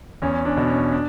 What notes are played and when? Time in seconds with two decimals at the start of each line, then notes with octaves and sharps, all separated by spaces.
0.22 E2 C#4
0.45 D4
0.57 B2
0.69 C#4
0.92 D4